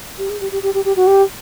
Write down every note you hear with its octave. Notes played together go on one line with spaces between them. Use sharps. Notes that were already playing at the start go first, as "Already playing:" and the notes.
G4
G#4
G4
G4
G4
G4
G4
F#4
G4